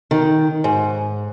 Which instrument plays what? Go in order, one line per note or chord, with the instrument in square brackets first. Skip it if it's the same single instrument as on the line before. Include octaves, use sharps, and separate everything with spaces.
[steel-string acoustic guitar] D#3
G#2